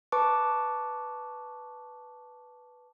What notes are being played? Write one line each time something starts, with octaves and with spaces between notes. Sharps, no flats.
B4 A5 C#6 D6